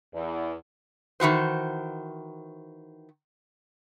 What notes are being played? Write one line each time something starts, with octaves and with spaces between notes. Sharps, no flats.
E2
D#3 E3 F#4 C5